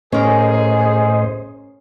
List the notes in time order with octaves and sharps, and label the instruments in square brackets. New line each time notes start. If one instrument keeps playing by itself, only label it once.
[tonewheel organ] A2 C5 D#5 [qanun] C#4 A#4 [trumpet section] G#4